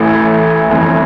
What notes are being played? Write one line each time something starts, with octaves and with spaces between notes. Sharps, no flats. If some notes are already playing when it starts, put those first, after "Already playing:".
Already playing: A1 A2 E3 A3
G1 F2 E3